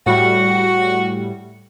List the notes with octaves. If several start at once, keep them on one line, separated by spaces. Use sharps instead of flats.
A2 G3 F#4